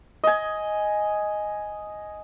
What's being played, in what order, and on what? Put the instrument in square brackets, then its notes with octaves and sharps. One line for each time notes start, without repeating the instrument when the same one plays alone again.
[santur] D#5 G#5